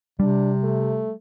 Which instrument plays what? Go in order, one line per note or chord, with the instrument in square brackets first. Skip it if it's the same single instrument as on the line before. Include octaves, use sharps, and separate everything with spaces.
[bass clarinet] C3 [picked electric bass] G3 [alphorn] D4
[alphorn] A3